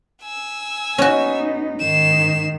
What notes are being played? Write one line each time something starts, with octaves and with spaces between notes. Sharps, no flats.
G#5 E6
B3 C#4 D#4 F#4
G#2 D#3 C7 E7